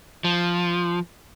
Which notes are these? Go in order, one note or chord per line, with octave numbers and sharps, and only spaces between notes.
F3